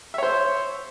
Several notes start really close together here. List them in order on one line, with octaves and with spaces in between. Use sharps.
E5 C#5 C5